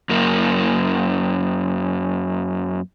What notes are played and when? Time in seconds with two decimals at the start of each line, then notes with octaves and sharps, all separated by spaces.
0.09 F#2 A#3